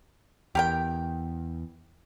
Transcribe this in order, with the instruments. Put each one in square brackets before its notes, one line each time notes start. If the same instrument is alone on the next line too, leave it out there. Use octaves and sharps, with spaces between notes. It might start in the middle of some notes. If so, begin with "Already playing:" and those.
[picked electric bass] E2 [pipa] G4 A#4 G5